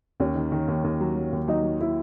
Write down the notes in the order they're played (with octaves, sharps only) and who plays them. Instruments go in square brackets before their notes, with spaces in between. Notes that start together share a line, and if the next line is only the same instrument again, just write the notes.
[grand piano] D#2 [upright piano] C#4
[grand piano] D#3
D#3
D#2
D#2
F#3
F#3
D#2
[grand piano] F#3 [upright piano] D#4
[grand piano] F#3
[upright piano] E4